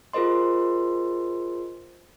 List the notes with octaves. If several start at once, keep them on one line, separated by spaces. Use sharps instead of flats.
F4 G#4 A#4 C5 D#5 C6